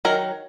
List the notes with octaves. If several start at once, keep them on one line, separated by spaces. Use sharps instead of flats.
D#3 F#3 A#4